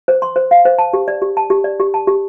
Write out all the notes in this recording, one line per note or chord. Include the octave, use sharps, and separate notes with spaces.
C5
C6
C5
F5
C5
A5
G4
D5
G4
A5
G4
D5
G4
A5
G4